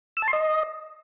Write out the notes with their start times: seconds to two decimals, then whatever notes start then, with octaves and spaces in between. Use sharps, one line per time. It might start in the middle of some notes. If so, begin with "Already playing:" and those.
0.17 E6
0.22 A5
0.28 C6
0.33 D#5